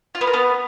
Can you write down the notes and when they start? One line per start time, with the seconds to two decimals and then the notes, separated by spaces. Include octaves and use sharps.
0.15 F4
0.21 B3
0.27 A#4
0.33 B3